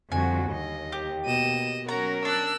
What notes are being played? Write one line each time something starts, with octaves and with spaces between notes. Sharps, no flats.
F2 D3 G3 F#4 G#5
D#2 D#5
G4
B2 A#3 D#5 D#7 E7
F#3 C#4 F#4 A#4 A#5
D4 E6 F#6